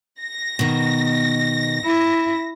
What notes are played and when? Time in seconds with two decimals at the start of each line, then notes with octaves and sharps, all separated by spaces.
0.22 A#6
0.59 B2 D#3
1.85 E4